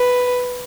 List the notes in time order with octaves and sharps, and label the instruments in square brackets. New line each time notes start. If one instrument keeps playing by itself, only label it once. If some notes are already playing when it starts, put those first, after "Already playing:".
Already playing: [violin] B4